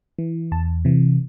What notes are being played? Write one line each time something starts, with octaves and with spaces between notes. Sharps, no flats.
E3
E2 A5
C3 E3